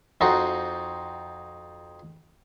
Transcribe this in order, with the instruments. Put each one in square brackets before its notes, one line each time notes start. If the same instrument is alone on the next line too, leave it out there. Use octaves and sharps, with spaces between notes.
[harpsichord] F2 C4 D#4 F#4